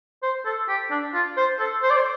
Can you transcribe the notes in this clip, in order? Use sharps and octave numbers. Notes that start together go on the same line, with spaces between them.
C5
A4
G4
D4
F4
C5
A4
C5
D5
C5